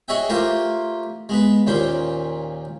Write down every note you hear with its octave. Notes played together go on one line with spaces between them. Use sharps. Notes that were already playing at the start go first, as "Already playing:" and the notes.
F#4 G#4 C#5 D#5 E5 G5
A3 A#3 F4 G4 A#4 C5
G#3 B3 B4
D#2 A#2 C#4 C5 G5